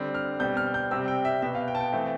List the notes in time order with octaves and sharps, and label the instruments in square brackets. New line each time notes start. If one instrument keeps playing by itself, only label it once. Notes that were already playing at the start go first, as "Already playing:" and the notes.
Already playing: [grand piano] D3 G3 C4
F6
B2 G3 C4 G6
F6
G6
C3 G3 C4 E6
G5
E5
B2 B3 E5
F5
G5
A5
G5
E3 A3 C4